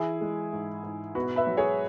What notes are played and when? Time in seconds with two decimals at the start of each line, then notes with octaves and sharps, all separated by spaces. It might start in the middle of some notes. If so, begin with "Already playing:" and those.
Already playing: E3 E4 G#4
0.21 G#3
0.53 G#2
0.84 G#2
1.15 B2 F#4 B4
1.36 B4 E5
1.47 F#3
1.57 G#4 C#5